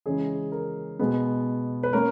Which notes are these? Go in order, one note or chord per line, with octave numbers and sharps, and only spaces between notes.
C#3 E3 G#3 C#4 G#4
A#4
B2 G#3 B3
B4
A#3 C#4 A#4